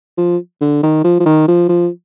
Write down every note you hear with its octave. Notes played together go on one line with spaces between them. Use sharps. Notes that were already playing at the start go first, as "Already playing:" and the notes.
F3
D3
D#3
F3
F3
D#3
F3
F3